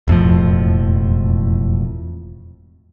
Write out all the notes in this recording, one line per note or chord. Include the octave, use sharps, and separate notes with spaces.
E1 F2 A2 F3